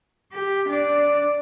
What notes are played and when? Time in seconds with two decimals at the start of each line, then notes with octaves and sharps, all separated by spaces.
0.33 G4
0.68 D4 D5